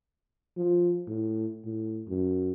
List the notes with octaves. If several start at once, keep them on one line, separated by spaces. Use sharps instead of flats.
F3
A2
A2
F#2